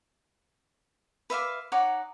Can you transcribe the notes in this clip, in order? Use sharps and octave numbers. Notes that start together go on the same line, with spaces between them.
B4 E5 F5 D6
D#4 C#5 F#5 D6